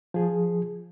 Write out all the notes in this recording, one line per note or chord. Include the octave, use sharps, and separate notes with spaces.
F3 G#4